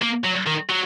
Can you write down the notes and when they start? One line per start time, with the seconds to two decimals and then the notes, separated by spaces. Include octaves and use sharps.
0.02 A#3
0.25 F#3
0.47 D#3
0.70 F#3